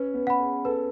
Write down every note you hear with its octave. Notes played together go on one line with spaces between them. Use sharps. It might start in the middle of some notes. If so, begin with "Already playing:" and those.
Already playing: C#4 B4
B3
F#5 B5
G#4
A4 B4